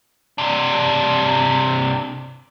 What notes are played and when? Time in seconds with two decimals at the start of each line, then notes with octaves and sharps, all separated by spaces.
0.38 C3 D4